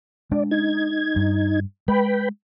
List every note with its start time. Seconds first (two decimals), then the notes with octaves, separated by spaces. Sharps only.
0.31 G#3 D4 D5
0.51 D#4 G#6
1.16 G2
1.88 G#3 B4 G5 B5